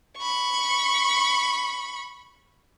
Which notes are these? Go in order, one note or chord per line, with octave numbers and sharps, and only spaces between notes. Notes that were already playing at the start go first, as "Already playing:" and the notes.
B5 C#6